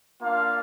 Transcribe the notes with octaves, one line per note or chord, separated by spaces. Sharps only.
A#3 D4 F4 F5